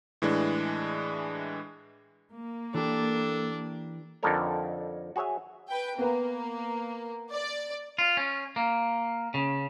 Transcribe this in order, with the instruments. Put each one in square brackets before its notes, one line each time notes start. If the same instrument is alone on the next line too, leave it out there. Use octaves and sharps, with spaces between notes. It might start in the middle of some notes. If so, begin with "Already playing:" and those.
[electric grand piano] A2 E3 G#3 D4
[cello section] A#3
[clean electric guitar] E3 G4 [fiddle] D4 [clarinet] A4
[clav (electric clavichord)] F2 D3 D#4 A4 A#4 C#5
F#4 G#4 C#5 E5 G#5
[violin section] B4 G5
[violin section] A#3 [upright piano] B3 A#4 B4
[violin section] D5
[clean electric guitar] F4
C#4
A#3
C#3